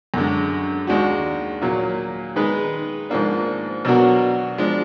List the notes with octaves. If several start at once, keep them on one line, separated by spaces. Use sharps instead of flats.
F#2 D3 G#3
D#2 D#3 G#3 D4 F#4
A#2 F#3 A#3
D#3 G#3 D#4 G#4 B4
G#2 F3 A#3 D4
B2 F#3 D4 F#4 A#4
F3 G#3 D4